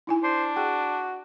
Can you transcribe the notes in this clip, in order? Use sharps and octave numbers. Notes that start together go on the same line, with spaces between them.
D#4 E4 G#5
D4 C5
F#4 G#4 G5